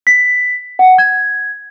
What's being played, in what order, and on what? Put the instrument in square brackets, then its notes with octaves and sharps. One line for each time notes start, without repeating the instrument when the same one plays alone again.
[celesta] B6
F#5
G#6